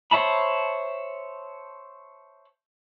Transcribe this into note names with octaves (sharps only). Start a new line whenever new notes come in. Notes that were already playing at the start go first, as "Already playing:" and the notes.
C5 C#5 E5 A5 B5